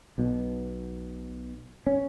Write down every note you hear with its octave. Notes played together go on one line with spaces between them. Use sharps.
B1 B2
C#4